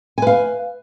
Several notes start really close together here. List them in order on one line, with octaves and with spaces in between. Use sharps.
G#5 B4 F5